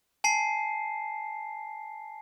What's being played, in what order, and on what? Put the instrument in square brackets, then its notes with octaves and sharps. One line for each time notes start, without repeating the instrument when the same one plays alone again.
[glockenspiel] G#5 A5 C7